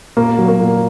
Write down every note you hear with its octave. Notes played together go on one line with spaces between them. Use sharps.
A#2 A#3
F#3
A#3
A#2